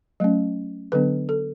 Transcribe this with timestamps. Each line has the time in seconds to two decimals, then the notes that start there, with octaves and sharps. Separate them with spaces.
0.20 F#3 A3 C#4
0.92 D3 F#3 B3 D4 B4
1.29 A4